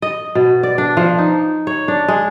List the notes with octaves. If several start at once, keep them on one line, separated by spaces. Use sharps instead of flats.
D#5
B2
D5
D4
F3
D#4
C#5
D4
G#3